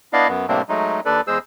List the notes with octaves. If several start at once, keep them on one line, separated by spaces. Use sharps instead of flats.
B3 D4 E4 D5 D#5 F5
F#2 B3
A2 C3 G3 A#3 C4 D4
F#3 G#3 A3 D#4
D#2 D4 A4 B4 D5
E2 G#3 G#4 C5 E6